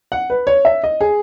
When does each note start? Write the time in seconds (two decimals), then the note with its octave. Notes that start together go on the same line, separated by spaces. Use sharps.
0.12 F#5
0.30 B4
0.47 C#5
0.65 E5
0.84 D#5
1.01 G#4